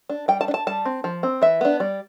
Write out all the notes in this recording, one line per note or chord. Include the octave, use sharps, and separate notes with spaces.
D4
G3 G5
A5
D4
A5
G3 A5
C4
F3
C4
E3 E5
B3 D4
G3 D5